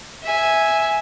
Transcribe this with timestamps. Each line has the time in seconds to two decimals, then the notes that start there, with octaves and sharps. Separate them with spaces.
0.23 E5 G#5